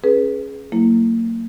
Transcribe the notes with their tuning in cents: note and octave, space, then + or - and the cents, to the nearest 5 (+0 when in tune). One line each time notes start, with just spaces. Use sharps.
C#4 -15 G#4 +10 B4 -15
F#3 +0 A#3 -30 E4 +0